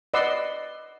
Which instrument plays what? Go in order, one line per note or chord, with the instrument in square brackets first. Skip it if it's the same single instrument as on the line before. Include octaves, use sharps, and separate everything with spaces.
[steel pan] B4 D5 D#5 F#5 C6 E6